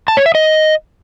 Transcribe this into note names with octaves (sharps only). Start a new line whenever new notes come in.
A5
C#5
E5
D#5